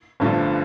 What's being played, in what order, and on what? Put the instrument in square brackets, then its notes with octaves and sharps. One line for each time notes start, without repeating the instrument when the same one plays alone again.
[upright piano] G1 G2 D3 F3 A3